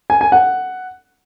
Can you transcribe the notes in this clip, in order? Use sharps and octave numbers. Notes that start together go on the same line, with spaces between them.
G#5
G#5
F#5